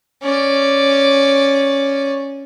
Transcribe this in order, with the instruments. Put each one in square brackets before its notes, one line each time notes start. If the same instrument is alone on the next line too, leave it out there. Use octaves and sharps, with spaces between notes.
[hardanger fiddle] C#4 D5